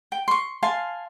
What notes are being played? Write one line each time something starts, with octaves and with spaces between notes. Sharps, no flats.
G5
C6 C#6
F5 G#5 A5 C6